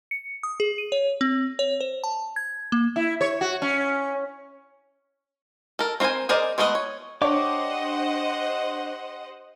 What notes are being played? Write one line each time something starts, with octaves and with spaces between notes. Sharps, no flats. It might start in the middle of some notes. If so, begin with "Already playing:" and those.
C#7
D#6
G#4
D#7
C#5
C4
C#5
C5
A5
G#6
A#3
E4
C#5
F#4
C#4
A4 A#4
C4 F4 A#4 C5 G#5
G#4 A#4 C5 D5 D#5
G#3 A3 B3 F4 D#5
C#5
D4 G4 C5 C#5 D#5 F#5 D6